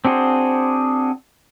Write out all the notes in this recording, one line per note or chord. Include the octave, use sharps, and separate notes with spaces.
C4 D4 F#4 G#4 C5